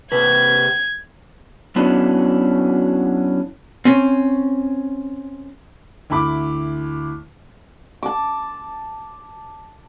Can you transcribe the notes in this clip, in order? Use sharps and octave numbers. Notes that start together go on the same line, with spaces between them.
C3 B4 G#6
F#3 B3 C#4 D4 E4 F#4
C4 C#4
D2 E4 B5 D6
A5 D6